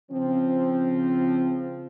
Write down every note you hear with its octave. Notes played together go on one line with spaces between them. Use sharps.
C#3 F3 C4